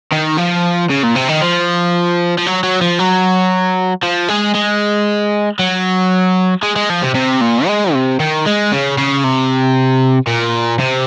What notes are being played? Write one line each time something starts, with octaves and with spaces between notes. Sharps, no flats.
D#3
F3
C#3
A#2
C3
D#3
F3
F3
F#3
F#3
F3
F#3
F3
G#3
G#3
F#3
G#3
G#3
F3
C3
C3
A#2
G#3
C3
D#3
G#3
C#3
C#3
C3
A#2
C3